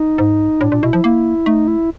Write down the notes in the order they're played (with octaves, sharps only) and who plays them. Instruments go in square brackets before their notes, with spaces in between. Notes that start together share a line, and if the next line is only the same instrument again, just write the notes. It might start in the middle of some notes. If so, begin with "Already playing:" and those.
Already playing: [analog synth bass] D#4
[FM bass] G#2
[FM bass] A2 [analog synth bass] D4
[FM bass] A#2
[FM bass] B2 [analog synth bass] E4
[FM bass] F3
A#3
[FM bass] A3 [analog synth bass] D#4
[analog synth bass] E4